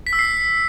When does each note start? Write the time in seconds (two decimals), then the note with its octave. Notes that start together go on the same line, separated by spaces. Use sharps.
0.07 B6
0.13 E6
0.19 C7